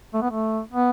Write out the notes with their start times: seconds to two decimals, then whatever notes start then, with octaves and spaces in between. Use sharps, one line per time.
0.14 A3
0.22 B3
0.30 A3
0.73 B3